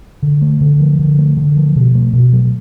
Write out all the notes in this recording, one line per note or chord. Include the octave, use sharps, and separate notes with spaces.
D3
A3
D3
F3
D3
A3
D3
F3
B2
A3
B2
F#3